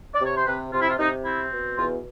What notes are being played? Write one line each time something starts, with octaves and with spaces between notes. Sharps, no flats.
D5
C3 C#5
C5
C3 B4
C3 F4
E4
F4
C3 D#4
C4 E4
B2
E2 F4